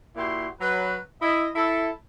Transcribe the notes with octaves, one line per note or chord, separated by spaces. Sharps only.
A#2 E4 F#4 G4 C6
F#3 B4
E4 D#5
E4 A4